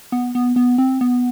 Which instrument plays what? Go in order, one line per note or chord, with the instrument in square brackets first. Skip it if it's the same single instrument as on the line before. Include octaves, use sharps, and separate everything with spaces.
[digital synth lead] B3
B3
B3
C4
B3